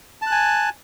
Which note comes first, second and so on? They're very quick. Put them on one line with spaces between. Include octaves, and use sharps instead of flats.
A5 F#6 G#5